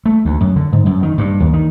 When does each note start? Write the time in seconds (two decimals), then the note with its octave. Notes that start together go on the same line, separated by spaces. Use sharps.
0.06 A3
0.25 D2
0.41 F#2
0.56 D3
0.72 G#2
0.86 F#2
1.03 D#3
1.18 G2
1.40 D#2
1.53 D#3